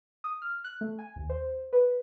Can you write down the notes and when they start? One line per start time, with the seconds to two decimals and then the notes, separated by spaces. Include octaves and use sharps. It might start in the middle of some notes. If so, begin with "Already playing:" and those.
0.24 D#6
0.42 F6
0.64 F#6
0.81 A3
0.99 G#5
1.16 D#2
1.30 C5
1.73 B4